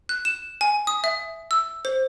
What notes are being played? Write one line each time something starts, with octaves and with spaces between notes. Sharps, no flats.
F#6
E7
G#5
D#6
E5
E6
C5